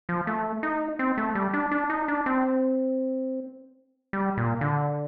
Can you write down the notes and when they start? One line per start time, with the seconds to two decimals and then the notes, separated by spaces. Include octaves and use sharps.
0.09 F3
0.27 A3
0.63 D#4
0.99 C4
1.18 A3
1.35 G3
1.53 D4
1.71 D4
1.90 D#4
2.08 D4
2.26 C4
4.13 G3
4.37 A#2
4.61 D3